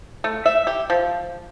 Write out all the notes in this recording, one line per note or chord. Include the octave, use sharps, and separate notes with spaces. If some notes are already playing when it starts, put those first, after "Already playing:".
A3
E5
G4
F3